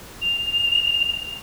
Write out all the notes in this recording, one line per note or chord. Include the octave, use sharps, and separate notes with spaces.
F7